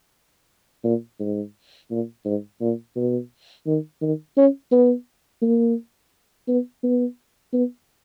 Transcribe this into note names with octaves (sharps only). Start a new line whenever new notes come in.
A#2
G#2
A#2
G#2
A#2
B2
D#3
D#3
C#4
B3
A#3
B3
B3
B3